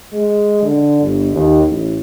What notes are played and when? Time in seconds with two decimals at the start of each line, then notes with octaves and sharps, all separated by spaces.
0.13 G#3
0.62 D3
1.01 G1
1.32 D#2
1.68 A1